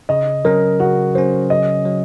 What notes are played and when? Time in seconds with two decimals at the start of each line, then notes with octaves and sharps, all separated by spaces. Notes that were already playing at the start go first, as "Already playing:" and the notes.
0.09 C#3 D#5
0.45 F#3 C#4 A#4
0.80 C#3 F#4
1.15 F#3 C#4 C5
1.50 C#3 D#5
1.86 F#3